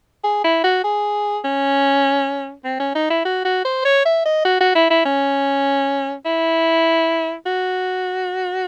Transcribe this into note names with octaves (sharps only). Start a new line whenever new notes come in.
G#4
E4
F#4
G#4
C#4
C4
C#4
D#4
E4
F#4
F#4
C5
C#5
E5
D#5
F#4
F#4
E4
E4
C#4
E4
F#4